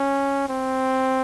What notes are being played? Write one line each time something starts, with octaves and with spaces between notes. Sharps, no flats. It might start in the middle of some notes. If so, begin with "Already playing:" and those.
Already playing: C#4
C4